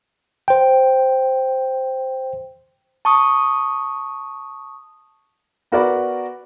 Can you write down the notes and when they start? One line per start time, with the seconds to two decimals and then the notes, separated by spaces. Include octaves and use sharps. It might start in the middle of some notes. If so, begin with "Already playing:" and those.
0.48 C5 G5
3.05 A5 C#6 D#6
5.72 B3 F#4 A#4 B4 D5